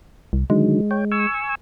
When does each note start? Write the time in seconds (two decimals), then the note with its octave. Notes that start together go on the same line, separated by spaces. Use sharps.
0.33 C2
0.50 D3 D#3 F#3 G#3
0.91 C#5 G5
1.11 G#5 C#6 E6